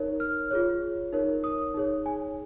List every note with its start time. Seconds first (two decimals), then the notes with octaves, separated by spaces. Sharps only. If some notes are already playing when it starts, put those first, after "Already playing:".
Already playing: D#4 A#4 C#5
0.20 F6
0.51 F4 G#4 C#5
1.13 D#4 A#4 C#5
1.44 D#6
1.74 D#4 G#4 C#5
2.06 G#5